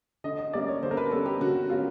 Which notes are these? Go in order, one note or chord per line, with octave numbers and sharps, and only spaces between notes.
D3 D#5
D#5
G3 A#3 C#4 D5
C#5
D3 C5
A#4
B4
G3 A#3 C#4 A4
G4
D3 F#4
G3 A#3 C#4 F4